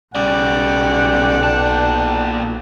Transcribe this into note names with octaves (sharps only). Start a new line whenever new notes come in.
B1 C#3 G3 D5 F#5 G5
A#2 A5